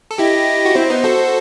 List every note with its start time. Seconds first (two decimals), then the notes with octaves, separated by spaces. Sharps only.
0.11 A4
0.18 E4 G4 D#5
0.65 F#4
0.75 C4 E4 C5
0.90 B3 D#4
1.04 F#4 A4